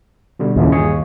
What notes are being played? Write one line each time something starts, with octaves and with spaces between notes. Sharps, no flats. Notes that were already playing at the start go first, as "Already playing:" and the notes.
B2 D3 G3
D#2 A#2 C#3 E3
G2 G#4 C#6